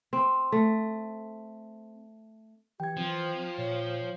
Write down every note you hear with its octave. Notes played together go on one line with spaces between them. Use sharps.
C4
A3
E3 G4 G5 G#6
F3 C4
A#2 C#5